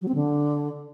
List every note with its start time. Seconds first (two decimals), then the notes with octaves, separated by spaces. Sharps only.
0.02 F#3
0.08 C4
0.15 D3